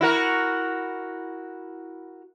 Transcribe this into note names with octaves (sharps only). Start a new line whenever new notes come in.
E4 F#4 A#4